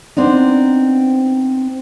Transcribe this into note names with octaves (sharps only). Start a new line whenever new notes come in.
B3 C4 D4 D#4